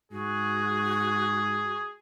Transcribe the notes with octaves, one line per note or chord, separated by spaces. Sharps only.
G#2 F#4 G#4